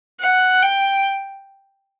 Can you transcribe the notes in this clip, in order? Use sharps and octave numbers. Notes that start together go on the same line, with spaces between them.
F#5
G5